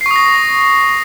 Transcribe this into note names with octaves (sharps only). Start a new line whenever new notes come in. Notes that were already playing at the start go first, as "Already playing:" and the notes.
C#6 D#6 A#6 C7